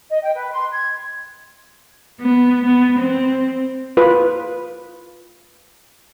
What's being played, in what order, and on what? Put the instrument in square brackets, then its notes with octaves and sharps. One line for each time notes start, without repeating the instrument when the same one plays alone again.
[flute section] D#5
G5
B4
C6
G#6
[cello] B3
B3
C4
[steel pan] F4 B4